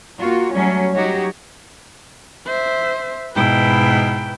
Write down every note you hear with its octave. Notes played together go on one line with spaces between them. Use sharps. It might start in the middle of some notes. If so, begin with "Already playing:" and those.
A#3 F4 F#4
F#3 G3 A3 C#4
F#3 D#4 F#4 G4 C#5
C5 E5
G#2 B2 E4 B4 G5